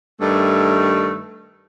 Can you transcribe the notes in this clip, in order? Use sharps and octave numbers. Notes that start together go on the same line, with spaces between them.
G2 D#3 A3